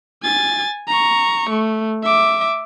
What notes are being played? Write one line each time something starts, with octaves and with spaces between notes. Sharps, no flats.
G#5 A6
A#5 C#6
A3
E5 D6